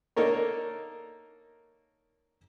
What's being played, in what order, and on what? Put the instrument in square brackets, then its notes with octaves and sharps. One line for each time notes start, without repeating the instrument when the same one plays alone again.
[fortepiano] A#3 D4 D#4 A4 A#4 C#5